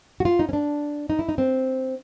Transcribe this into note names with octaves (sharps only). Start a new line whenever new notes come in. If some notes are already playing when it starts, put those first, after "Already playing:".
F#4
F4
D#4
C#4
D4
D#4
E4
D#4
C4